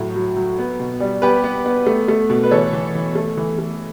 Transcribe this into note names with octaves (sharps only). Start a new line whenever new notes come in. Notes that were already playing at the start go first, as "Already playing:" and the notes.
Already playing: A2 F#3
F#3
F#3
B3
B2
G3
B3 G4 B4
B3
B3
A3
A3
B2
B4
E3 A4 C#5
E3
E3
A3
E3
A3